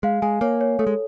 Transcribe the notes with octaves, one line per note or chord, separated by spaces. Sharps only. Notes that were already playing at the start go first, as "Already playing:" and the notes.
G#3 F5
G#3 G#5
A#3 C#5
C#5
A3 A4
G#3